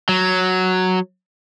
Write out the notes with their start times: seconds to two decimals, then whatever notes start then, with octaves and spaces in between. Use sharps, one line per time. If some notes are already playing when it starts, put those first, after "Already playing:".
0.09 F#3